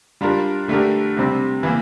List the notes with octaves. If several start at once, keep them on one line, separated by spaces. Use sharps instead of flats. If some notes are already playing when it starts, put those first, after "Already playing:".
G3 D4 F4 A#4
D3 A3 D4 G4 A#4
C3 G3 C4
E3 A#3